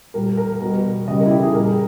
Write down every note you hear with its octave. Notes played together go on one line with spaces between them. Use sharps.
A#2 G3 A#4
A#4
B2 G3 B4
C#3 G3 D#5
A#4
E4
G4
G#4
A#2 G3 A#4